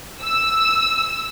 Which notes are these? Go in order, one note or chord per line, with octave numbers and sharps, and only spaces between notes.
E6